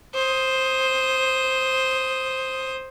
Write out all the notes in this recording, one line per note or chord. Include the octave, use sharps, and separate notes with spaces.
C5 D#6